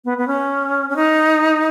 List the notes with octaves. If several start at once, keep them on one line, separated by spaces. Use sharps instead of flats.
B3
B3
C#4
C#4
D#4